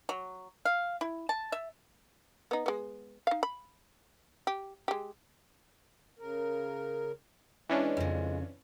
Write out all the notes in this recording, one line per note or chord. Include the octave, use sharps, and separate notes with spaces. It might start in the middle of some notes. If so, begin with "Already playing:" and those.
F#3
F5
E4
A5
E5
B3 D#4
G#3 B3
D#4 F5
B5
G4
G#3 G4
C#3 A#4
E3 G#3 C#4 D4
F2 C#3